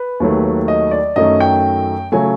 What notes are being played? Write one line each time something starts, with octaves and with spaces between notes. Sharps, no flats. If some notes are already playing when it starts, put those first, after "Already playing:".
Already playing: B4
D#2 D#3 F#3 A3
D#5
D5
F#2 D#3 F#3 A3 D#5
G5
C#3 F#3 A3 G#5